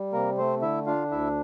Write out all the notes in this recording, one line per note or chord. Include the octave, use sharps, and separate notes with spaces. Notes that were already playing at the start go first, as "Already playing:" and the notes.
Already playing: G3
C3 A#3 A#4
A3 C4 C5
D3 E4 E5
D4 F4 F5
D2 E4 E5